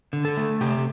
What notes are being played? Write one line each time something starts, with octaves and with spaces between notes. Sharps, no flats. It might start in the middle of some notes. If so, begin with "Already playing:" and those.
D3
A4
A3
C3 G4